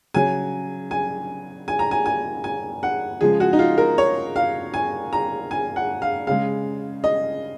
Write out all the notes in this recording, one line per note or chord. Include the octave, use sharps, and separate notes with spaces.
C#3 F#3 G#5
G#5
G#5
A#5
G#5
G#5
G#5
F#5
C#3 F3 G#3 G#4
F#4
D#4
F4
A#4
C#5
F5
G#5
A#5
G#5
F#5
F5
C#3 G#3 F5
D#5